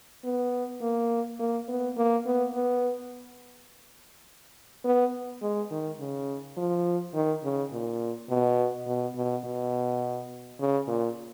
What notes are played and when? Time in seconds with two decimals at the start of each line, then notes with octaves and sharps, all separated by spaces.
0.24 B3
0.81 A#3
1.39 A#3
1.68 B3
1.97 A#3
2.26 B3
2.54 B3
4.85 B3
5.42 G#3
5.71 D#3
6.00 C#3
6.57 F3
7.14 D#3
7.44 C#3
7.72 A#2
8.30 B2
8.87 B2
9.16 B2
9.44 B2
10.60 C#3
10.88 A#2